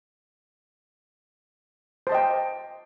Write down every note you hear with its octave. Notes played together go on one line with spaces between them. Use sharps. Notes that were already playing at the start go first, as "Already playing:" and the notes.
C5 D#5 G5 A5